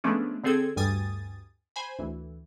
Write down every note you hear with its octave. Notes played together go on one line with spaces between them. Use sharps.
F3 G#3 A3 B3 C#4 D4
D3 C4 G#4 A4 G#6
D2 G2 G3 G#5 D#6 A6
C5 G#5 B5
D2 E3